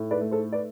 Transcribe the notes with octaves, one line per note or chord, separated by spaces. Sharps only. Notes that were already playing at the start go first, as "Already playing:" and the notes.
Already playing: A2
B4 D5
A3
A4 C5
B4 D5